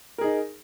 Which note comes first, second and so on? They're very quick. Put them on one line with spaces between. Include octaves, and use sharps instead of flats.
A#4 G#4 D#4